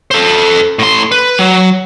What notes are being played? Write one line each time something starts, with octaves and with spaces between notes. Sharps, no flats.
A4 C5
A2 C6
B4
F#3